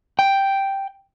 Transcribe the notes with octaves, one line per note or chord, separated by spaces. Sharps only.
G5